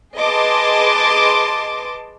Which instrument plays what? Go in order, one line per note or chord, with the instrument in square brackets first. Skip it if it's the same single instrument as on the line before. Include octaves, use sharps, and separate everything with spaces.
[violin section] G#4 B4 D#5 A5 C6 D6